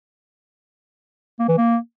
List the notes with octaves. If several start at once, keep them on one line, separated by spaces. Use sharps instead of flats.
A#3
E3
A#3